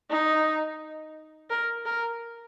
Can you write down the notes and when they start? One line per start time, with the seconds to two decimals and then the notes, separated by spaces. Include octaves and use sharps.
0.11 D#4
1.51 A#4
1.86 A#4